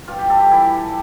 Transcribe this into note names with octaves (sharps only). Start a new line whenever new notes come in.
G2 F4
G4
G3 A4
G4
E3 E4